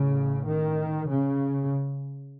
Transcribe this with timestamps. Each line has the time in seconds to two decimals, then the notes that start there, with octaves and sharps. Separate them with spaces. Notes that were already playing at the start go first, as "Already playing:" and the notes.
Already playing: A1 A2 C#3
0.47 D#3
1.07 C#3